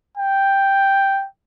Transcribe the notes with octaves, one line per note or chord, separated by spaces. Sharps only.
G5